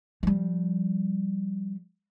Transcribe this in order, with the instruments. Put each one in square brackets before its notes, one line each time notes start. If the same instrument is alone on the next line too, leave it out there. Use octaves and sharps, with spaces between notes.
[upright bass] F3 G3